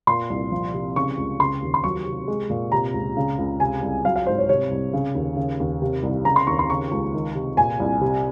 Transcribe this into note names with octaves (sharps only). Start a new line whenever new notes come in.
A#2 C6
C2
F3
C3
C#3 C#6
C#2
C#3 C6
D#2
C6
F#3 C#6
C3
G#3
A#2
C3 A#5
C#2
C#3
C#2
C3 G#5
C2
F#3 F5
F5
G#2 C5
C#5
C3 C#5
C2
C#3
D#2
C#3
D#2
C3
C2
C#3 A#5
C6
D#2 C#6
C6
C#3 C#6
C#2
D#3
C3
A#2 G#5
C2
C3